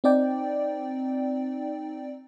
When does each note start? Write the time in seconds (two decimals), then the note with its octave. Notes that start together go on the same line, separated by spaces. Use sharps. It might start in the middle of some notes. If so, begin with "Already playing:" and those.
0.04 C4 D#4 D5 G5